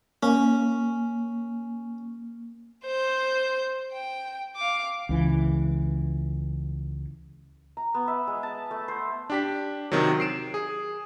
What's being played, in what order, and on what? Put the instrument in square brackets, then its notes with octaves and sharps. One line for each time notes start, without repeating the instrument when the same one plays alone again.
[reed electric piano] A#3 [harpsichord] C#4
[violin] C5 G6
G5
F5 D6
[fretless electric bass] C#2 E3
[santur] A#5
B3
E5
G#3
A5
A3
C5
[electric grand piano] D4 G4 B6
C3 D#3 F#3
C7 D7 E7
G#4